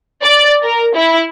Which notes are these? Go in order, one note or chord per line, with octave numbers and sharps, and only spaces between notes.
D5
A#4
E4